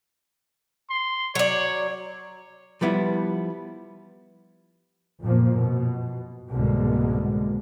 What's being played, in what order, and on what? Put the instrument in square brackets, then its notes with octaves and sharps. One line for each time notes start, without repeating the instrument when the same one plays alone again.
[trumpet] C6
[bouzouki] F#3 D5 [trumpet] C#5
[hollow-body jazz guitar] F3 G3 B3 E4
[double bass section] F#1 F2 A#2 F3 A#3
B2
C2 G#2 B2 D3 G#3 A#3